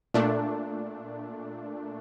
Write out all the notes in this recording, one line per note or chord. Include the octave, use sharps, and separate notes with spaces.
A#2 A3 D4